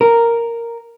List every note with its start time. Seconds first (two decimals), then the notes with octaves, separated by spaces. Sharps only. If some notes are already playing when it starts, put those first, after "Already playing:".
0.01 A#4